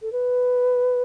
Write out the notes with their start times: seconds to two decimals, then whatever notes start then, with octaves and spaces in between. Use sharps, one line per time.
0.02 A4
0.12 B4